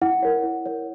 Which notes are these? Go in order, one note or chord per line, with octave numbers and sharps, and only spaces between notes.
E4 F#5
A#4 C#5
E4
A#4 C#5